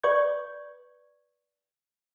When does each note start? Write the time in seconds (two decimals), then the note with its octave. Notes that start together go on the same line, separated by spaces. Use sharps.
0.03 B4 D5 C#6 G6 G#6